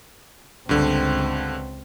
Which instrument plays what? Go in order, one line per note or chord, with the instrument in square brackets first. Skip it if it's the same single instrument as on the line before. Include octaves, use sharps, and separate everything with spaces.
[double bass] C#2 C4 [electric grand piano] G2 D3